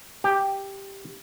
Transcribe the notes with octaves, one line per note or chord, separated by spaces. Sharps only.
G4